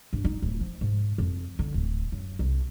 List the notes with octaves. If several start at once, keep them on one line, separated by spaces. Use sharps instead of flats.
G2
D#4
D1
F3
G#2
F2
D3
D1
F#2
C2